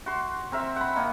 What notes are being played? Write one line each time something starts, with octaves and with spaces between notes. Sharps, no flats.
F#4 C6
C4 A#4 E5
F#5 B5
D#3 A#3 D#4